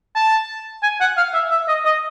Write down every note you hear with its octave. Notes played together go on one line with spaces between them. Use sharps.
A5
G#5
F#5
F5
E5
E5
D#5
D#5